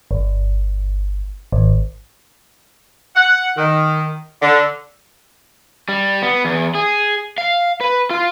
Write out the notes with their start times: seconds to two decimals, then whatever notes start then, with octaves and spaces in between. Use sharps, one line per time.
0.11 G1
1.52 G#1
3.16 F#5
3.58 D#3
4.42 D3
5.89 G3
6.22 B3
6.45 E2
6.75 G#4
7.38 F5
7.81 B4
8.10 F4